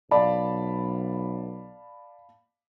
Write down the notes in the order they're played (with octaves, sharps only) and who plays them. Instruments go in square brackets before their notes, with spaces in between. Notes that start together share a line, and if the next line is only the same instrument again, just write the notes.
[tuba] B1 [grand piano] D5 [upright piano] F5 A5 B5